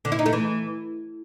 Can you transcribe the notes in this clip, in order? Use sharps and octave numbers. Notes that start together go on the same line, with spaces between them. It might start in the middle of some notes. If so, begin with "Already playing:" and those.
D3
E4
D#4
A3
E3